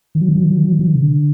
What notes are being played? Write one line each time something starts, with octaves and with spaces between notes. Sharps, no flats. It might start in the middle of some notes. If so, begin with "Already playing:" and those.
D#3
F#3
D#3
F#3
D#3
F#3
D#3
F#3
D#3
F#3
D#3
C3
D3